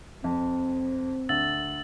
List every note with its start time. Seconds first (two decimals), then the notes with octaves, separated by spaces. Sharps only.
0.24 F2 C4
1.29 D2 E6 A6 F#7